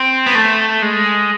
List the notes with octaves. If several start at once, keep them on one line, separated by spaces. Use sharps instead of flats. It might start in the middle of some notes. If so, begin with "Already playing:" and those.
Already playing: C4
B3
A3
G#3